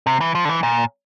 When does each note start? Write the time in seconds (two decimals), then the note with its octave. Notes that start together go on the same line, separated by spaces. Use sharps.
0.07 C3
0.21 E3
0.35 F3
0.45 D3
0.49 E3
0.63 A#2